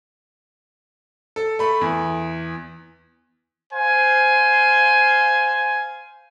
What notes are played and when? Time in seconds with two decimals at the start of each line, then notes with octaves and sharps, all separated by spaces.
1.36 A4
1.59 A3 B5
1.81 E2
3.73 C5 F5 G#5